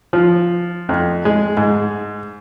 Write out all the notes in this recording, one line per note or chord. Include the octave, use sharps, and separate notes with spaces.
F3
F2
G#3
G#2